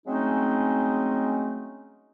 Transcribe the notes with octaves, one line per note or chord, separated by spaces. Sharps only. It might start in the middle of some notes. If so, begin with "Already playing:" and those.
F#3 G#3 A3 C4 C#4 D#4